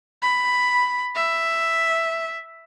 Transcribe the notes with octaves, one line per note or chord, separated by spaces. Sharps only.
B5
E5